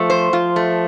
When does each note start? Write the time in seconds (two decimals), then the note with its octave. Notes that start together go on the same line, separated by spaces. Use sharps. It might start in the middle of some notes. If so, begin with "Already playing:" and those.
Already playing: F3 A3
0.10 C5
0.33 F3 F4
0.56 A3